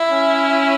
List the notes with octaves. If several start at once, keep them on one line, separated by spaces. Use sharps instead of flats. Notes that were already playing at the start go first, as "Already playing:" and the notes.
Already playing: E4
C#4